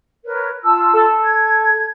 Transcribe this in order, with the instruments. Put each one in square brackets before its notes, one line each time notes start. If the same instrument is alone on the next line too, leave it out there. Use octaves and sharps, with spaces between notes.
[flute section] A#4 B4 C#5
F4 A5 E6
[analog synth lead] A4
[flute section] G#6